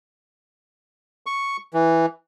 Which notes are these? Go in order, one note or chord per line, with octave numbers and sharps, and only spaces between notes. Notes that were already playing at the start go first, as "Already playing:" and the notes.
C#6
E3